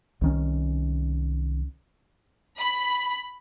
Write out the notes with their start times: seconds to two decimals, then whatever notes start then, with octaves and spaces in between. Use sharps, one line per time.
0.21 C2 D#3 C#4
2.59 B5